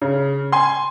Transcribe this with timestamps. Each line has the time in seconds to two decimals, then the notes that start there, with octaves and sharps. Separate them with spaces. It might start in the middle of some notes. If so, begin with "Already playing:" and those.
0.02 C#3
0.52 G#5 C6